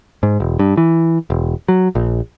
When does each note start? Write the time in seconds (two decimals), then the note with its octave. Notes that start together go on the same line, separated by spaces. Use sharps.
0.23 G#2
0.40 E1
0.59 G2
0.77 E3
1.30 E1
1.68 F#3
1.95 A#1